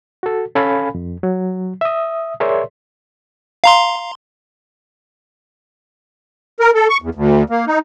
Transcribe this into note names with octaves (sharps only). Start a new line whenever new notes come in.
F#4 A4
C#4 A4 F5 G#5 B5
F2
F#3
E5 D#6
G#4 A#4 C#5 D5 E5 C6
F5 A#5 C6
A#4
A4
C#6
E2
D2
A#3
D#4